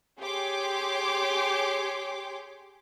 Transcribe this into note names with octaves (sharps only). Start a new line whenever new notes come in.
G4 G#4 C#5 G5 C6 D6